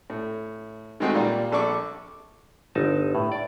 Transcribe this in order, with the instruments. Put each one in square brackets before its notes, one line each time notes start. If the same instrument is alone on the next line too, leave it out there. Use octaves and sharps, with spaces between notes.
[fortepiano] A2
D#3 G#3 A3 C4 D#4 F#4
A#2 G3 A#3
A#1 A4 D5 C#6 D6
[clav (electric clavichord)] G1 D#4 A5
A2
D5